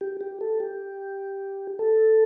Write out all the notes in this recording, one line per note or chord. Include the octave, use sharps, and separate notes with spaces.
G4
G4
A4
G4
A4